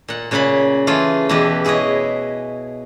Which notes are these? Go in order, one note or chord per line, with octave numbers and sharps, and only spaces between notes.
A#2 F#5
A#2 C#3 F#5 G#5 B5
E3 A3 F4 G#4
E2 B2 E4 G4 B4
E4 G#4 B4 C#5 D#5